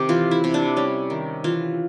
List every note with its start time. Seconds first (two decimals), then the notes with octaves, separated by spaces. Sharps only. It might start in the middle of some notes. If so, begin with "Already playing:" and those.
Already playing: C3 D#3 G4
0.09 E3 F4
0.31 E4
0.44 C3
0.54 D4
0.77 G3 C#4
1.10 D#3
1.44 E3 F4